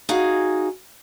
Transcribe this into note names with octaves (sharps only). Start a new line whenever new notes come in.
D#4 F#4 G#4 F5